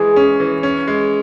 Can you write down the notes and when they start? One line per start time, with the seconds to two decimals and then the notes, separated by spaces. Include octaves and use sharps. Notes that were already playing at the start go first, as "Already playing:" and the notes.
Already playing: E3 G#3 G#4
0.16 C#4
0.40 E3
0.63 C#4
0.88 G#3